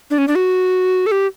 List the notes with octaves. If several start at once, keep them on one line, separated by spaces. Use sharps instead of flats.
D4
C#4
D4
F#4
A4
G4